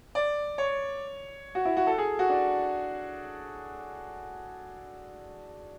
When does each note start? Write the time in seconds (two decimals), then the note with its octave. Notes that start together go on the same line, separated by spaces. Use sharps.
0.15 D5
0.58 C#5
1.55 F#4
1.65 E4
1.77 F#4
1.87 A4
1.98 G#4
2.19 F#4
2.30 D4